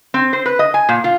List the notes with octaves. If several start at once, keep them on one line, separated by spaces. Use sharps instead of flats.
C4
C5
B4
D#5
G#5
A#2
F4